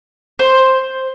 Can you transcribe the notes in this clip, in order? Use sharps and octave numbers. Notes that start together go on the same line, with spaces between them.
C5